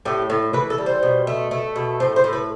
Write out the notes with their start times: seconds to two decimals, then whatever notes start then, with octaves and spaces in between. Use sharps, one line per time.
0.05 A2 G4
0.30 A2
0.53 E3 B4
0.70 A4
0.78 G3
0.86 C5
1.03 B2
1.27 A3
1.51 A3
1.76 B2
2.00 A2 C5
2.16 C5
2.24 A2
2.33 B4